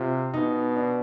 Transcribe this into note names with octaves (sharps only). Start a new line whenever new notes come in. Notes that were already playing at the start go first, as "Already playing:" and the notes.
Already playing: C3 F4
B2 D#4
D4